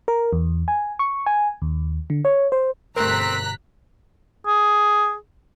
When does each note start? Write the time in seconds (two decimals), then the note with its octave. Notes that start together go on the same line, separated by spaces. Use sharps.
0.08 A#4
0.33 E2
0.68 G#5
0.99 C#6
1.26 G#5
1.62 D#2
2.10 D3
2.25 C#5
2.52 C5
2.96 G1 B2 A3 C4 A#4 A#5 F#6 B6
4.47 G#4